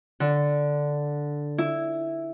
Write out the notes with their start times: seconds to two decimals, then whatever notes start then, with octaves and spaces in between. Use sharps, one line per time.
0.20 D3
1.58 E4